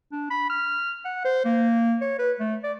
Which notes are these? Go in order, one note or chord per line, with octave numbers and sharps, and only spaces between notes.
D4
B5
F6
F#5
C5
A#3
C#5
B4
A3
D5